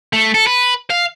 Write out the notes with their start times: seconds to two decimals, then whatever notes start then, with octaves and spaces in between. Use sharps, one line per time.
0.13 A3
0.34 A4
0.47 B4
0.90 F5